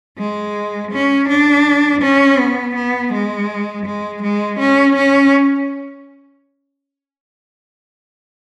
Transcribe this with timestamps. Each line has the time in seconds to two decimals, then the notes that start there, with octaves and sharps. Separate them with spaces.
0.18 G#3
0.92 C#4
1.29 D4
2.02 C#4
2.38 B3
2.75 B3
3.13 G#3
3.86 G#3
4.22 G#3
4.59 C#4
4.96 C#4